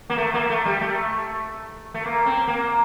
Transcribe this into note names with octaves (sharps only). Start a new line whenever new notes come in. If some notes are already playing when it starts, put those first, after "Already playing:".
A#3
A3
A#3
A3
G3
A3
A3
A#3
C4
A#3